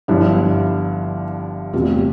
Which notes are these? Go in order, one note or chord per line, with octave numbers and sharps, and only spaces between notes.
G1 G2 F3 E4
F1 E2 C3 G3 F4